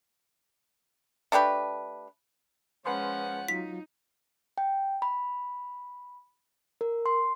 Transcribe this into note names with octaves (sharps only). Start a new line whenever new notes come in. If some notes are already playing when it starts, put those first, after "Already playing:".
A3 D4 G4 B4
F3 G#3 C#4 B4 F#5 G#5 C6
F#3 D#4 F4 B6
G5
B5
A#4
C6